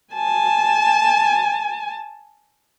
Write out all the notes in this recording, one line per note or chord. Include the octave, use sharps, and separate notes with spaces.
G#5 A5